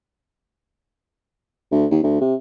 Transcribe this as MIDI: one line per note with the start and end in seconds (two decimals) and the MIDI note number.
1.71 1.86 38
1.91 2.00 39
2.03 2.20 38
2.21 2.35 48